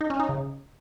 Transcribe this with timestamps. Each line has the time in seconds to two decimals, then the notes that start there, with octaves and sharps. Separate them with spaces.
0.01 D#4
0.10 C#4
0.20 D#4
0.29 C#3